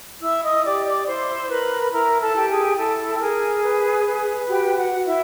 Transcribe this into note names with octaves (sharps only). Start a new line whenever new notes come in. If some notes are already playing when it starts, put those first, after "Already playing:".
E4 E5 E6
D#5 D#6
G4 D5 D6
D5 D6
E4 C5 C6
A#4 B4 B5
E4 A#4 A#5
A4 A5
G4
G#4 G#5
E4 A4 A5
G5
G#4 A#4 G#5
B4
B4
F#4 G4 G5
F#4 F#5
F#4
E4 E5